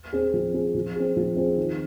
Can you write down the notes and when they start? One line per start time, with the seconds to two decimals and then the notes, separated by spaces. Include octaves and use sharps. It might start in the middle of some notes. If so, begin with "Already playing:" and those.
0.13 C4 G#4
0.34 F3
0.53 C4 G#4
0.75 F3
0.96 C4 G#4
1.17 F3
1.37 C4 G#4
1.57 D#3